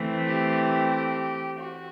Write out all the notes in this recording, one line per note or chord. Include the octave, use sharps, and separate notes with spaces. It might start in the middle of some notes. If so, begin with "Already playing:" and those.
Already playing: E3 A3 C4
G4
G4
F#4